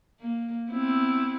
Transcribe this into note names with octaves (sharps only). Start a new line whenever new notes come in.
A#3
B3 C4 E4